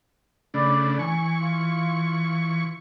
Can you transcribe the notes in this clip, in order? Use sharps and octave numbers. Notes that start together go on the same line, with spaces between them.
C#3 A3 D4 D5 B5
E3 G#5 C#6
F4